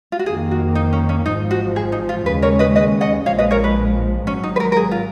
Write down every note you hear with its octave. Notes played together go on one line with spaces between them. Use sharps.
F4
F#4
F2 D#3 A#3 G#4
F#4
D#4
C#4
C#4
G#1 G#2 F3 D#4
F#4
G#4
D#4
F4
D#2 C#3 G#3 C#4 B4
A#4 C#5
B4 D#5
B4 D#5
D#5 F#5
A#1 A#2 F3 G#3 C#5 F5
B4 D#5
A#4 C#5
B4
G#1 G#2 F#3 C#4
D#4
B4
A#4
A#4
G#4
F4